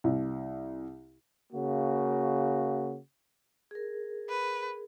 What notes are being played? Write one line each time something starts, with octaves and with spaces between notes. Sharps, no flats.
C2
C#3 A#3 F#4
G#4 A#4
B4